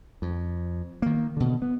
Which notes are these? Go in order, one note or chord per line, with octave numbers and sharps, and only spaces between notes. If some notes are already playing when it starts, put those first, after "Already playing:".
F2
D#3 A#3
B2 D3
B3